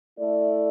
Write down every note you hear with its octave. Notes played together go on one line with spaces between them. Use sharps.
A3 E4 A4 D5